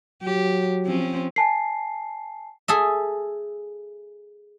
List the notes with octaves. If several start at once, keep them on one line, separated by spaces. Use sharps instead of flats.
F#3 G4
F3 C4 C#4
G#5 A5 C7
G#4 A4 E5